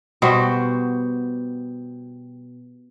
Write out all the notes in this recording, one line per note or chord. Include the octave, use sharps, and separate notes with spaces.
B2 G3 F#4 C5